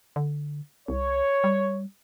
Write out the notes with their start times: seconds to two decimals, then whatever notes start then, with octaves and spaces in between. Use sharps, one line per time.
0.16 D3
0.88 C2 C#5
1.44 G3